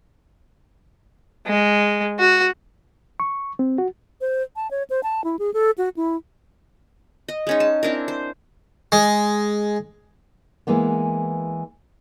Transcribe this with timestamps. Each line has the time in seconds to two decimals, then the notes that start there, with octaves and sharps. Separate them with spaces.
1.47 G#3
2.19 F#4
3.20 C#6
3.59 C4
3.78 F#4
4.21 C5
4.56 A5
4.71 C#5
4.90 C5
5.03 A5
5.24 E4
5.39 G#4
5.54 A4
5.78 F#4
5.96 E4
7.28 D#5
7.47 G#3 C#4 D#4
7.60 A5
7.83 C4 D4 E4 A#4
8.08 C5
8.92 G#3
10.67 E3 G#3 A#3 B3